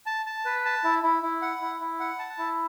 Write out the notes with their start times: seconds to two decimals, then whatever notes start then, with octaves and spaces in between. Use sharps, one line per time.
0.06 A5
0.26 A5
0.45 B4
0.65 A5
0.84 E4
1.03 E4
1.22 E4
1.42 F#5
1.61 E4
1.80 E4
2.00 F#5
2.19 A5
2.38 E4